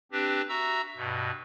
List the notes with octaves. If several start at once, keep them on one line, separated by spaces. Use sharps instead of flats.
C4 D4 G4 B4
F#4 E5 A#5 E6
G2 B2